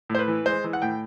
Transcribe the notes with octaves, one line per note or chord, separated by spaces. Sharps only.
A2
C5
B4
E3
G#3 C5
E3
F#5
A2 G5